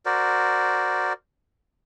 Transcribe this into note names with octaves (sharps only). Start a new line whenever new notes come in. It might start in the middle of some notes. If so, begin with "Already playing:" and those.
F#4 A#4 C5 D5